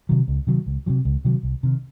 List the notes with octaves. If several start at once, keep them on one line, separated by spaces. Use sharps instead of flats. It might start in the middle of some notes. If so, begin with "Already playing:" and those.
C3 D#3 F#3
C#2
C3 D#3 F#3
C#2
C3 D#3 F#3
C#2
C3 D#3 F#3
C2
C3 D#3